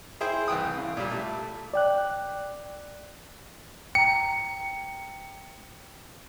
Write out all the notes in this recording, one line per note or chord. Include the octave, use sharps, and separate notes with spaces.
E4 G#4 C5 G5
C2 E3 G5 D#6
C#3
A#2 G3
A3
D5 G5 F#6
G5 A#5 C#7